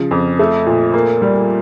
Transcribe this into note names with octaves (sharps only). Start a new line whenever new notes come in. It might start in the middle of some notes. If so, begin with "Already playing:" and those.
Already playing: C#3 F3
F2
A3
A#2
A#3
G3